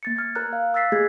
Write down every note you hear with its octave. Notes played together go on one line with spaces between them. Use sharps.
A#3 A6 C#7
F6 G#6
A#4 A#5 F6 F#6
F5
E6 F#6 A6 B6 C7
A3 G#4 G#6